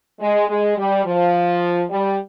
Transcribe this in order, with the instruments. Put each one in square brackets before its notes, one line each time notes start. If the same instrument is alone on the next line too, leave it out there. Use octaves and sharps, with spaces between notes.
[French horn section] G#3
G#3
G3
F3
G3